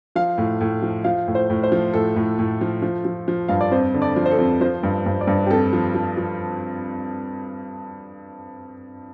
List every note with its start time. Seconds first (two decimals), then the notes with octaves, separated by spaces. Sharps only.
0.16 F3 F5
0.38 A2
0.61 A2
0.82 F3
1.04 F3 F5
1.28 A2
1.35 C5
1.50 A2
1.63 C5
1.72 F3
1.94 A2 A4
2.16 A2
2.39 A2
2.61 F3
2.82 F3
3.05 F3
3.28 F3
3.48 G2 F5
3.61 D5
3.71 F2 C5
3.94 D3
4.02 D5
4.16 F3
4.26 C5
4.31 A4
4.38 F2
4.61 F3 C5
4.83 G2
5.06 G2
5.21 D5
5.27 G2
5.47 G4
5.50 F2 A4
5.73 F3
5.95 F3
6.17 F3